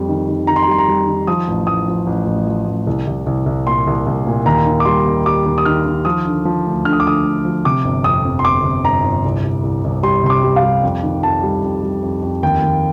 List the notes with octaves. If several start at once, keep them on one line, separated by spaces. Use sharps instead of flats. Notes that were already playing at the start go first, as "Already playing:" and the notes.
Already playing: F2 G3
D#3
D#3
D#3 A#5
C6
A#5
G3 C6
A#5
G3
D#3
F3 D#6
A1
A1 D#6
F3
A1
A1
F3
A1
C2
C2
C2
C2
A#2 C6
C2
C2
A#2
D#2 A#5
D#3
D6
G3 C6
D#2
G3 D6
D#2
D#6
D#3 F6
D#3
F3 D#6
D3
F3
D2
D3 F6
D#6
D6
D2 D#6
D2
F3
C3 D6
G1
F2 D#6
F2
C6
G1 D6
C3
G1 A#5
G1
C2
C2
C2
C2
G3 C6
C3 C6
D6
G3
F5
G3
F2
D#3
F2 A5
G3
F2
G3
F2
F2
D#2 G5
D#2